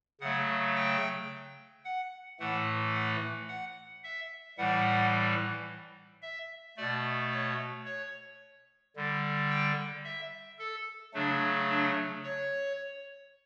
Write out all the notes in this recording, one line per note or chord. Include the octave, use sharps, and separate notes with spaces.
C#3 F#3 A3 F#5
G5
F#5
A2 E3 A3 F#5
F#5
F#5
E5
A2 E3 G3 F#5
E5
B2 A3 D5
C#5
C#5
D3 G3
G5
E5
A4
C#3 F#3 A3 D4
D4
C#5